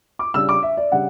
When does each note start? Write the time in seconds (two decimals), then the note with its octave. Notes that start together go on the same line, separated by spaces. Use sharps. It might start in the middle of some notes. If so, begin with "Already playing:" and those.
0.19 D6
0.34 C#3 G3 D4 E6
0.49 D6
0.63 E5
0.77 D5
0.92 C#3 G3 D4 F#5